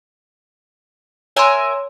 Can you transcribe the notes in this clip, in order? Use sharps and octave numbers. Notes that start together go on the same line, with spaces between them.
A#4 C#5 E5 G#5 C6